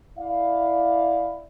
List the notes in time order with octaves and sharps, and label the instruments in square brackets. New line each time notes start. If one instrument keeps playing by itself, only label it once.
[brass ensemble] E4 D5 F5